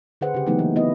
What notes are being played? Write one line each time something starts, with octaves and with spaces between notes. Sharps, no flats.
D3 G#4 B4 C5 F#5
C#3 G4
E3 F#3 A3 B3 D#4
E3 A#3
B3 E4 D#5